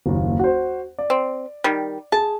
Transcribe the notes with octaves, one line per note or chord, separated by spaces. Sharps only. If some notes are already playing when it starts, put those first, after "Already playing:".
F#1 D#2
F#4 C5
D5
C4
D#3 G3
G#4 A5